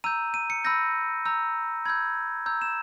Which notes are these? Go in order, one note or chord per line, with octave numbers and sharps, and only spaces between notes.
A#5 E6 G6 D#7
D#7
C#7
B5 E6 G6 A#6
A#5 E6 G6
B5 E6 G6 G#6
A#5 E6 G6
E7